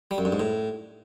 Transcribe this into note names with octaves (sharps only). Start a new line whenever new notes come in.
G3
F#2
G2
G#2
A2